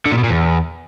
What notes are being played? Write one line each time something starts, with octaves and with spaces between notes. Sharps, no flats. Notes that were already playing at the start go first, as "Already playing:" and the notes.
D3
A#2
B2
A#2
E2